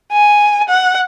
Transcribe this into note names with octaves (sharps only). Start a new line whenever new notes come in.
G#5
F#5